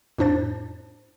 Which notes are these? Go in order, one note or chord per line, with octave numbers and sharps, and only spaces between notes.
F2 A2 D4 C5 A6